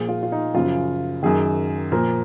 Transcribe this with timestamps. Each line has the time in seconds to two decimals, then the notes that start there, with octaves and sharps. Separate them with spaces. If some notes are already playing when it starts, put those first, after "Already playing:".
Already playing: A#2 F3 G#4
0.09 F4
0.23 F4
0.32 D#4
0.54 F#2 C#3 F3 F4
1.23 F#2 D#3 G#4
1.92 A#2 F3 A#4